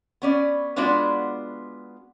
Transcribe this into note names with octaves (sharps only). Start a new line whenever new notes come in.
B3 C#4 D5
G#3 B3 D4 F4 F#4 D5